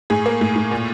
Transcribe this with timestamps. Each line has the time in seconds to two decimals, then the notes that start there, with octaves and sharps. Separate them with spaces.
0.10 A2 G#4
0.26 A#3
0.41 A2
0.56 A2
0.71 A#2